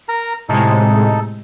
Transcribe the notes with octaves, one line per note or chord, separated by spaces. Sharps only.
A#4 A#5
A2 C3 G#3 D#4 A4